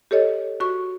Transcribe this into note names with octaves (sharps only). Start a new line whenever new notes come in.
G4 A4 C#5 D#5
F#4 C#6